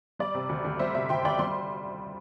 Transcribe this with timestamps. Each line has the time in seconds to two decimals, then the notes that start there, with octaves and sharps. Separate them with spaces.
0.19 G3 D5
0.34 C3
0.49 D2
0.65 D2
0.79 G3 C5 E5
0.94 C3 C5 E5
1.09 D2 G5 C6
1.24 D2 D5 G5
1.39 G3 C6